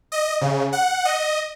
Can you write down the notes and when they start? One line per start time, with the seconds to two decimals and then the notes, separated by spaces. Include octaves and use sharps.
0.12 D#5
0.41 C#3
0.73 F#5
1.05 D#5